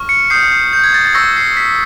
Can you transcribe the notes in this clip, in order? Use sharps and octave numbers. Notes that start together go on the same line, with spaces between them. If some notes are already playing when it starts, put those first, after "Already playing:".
Already playing: C#6 F6
C#7
D#6 G6 C7
C#7
C7
G6
G#6
A6
A6
C#6 E6 G6 A#6
C7
B6